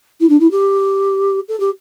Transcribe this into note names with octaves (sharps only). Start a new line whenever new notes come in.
E4
D4
E4
G4
A4
G4